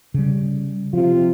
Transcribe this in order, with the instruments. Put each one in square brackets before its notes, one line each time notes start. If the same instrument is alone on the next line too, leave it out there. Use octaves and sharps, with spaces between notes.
[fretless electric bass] C#3 G3
[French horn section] C3 F4 [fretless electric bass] F3